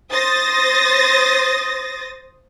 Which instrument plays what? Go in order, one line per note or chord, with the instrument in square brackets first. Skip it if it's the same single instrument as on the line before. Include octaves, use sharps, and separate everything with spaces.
[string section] C5 D#6 A6 A#6